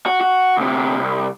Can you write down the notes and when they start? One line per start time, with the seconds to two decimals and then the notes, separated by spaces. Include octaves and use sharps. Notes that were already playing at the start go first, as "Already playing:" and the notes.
0.06 F#4
0.21 F#4
0.57 D2 C3
0.99 C2